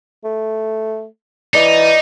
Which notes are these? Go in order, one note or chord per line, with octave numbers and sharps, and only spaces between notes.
A3
E3 D#4 D5 D#5